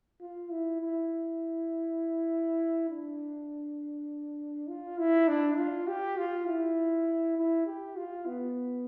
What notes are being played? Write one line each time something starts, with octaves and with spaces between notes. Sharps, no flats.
F4
E4
E4
D4
F4
E4
D4
F4
G4
F4
E4
E4
G4
F4
B3